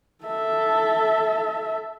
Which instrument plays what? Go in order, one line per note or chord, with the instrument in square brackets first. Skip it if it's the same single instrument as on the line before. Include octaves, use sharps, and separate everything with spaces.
[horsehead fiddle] A4 E5